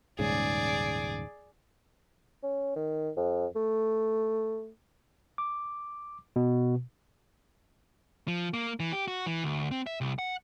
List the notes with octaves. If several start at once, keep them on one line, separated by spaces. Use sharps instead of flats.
D#1 G#2 C#3 G#4 D5
C#4
D#3
F2
A3
D6
B2
F3
A#3
E3
G4
F#4
E3
D2
C4
E5
C2
F#5